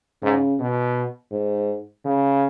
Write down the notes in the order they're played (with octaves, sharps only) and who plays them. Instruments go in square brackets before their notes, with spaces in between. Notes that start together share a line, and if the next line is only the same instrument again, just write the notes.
[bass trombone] G#2 [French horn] C#3
[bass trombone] B2
[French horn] G#2
[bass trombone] C#3